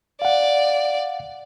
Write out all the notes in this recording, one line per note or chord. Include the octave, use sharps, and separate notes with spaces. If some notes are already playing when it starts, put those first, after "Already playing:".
D5 F5 F#5